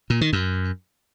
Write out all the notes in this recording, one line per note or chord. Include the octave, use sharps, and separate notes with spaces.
A#2
D#3
F#2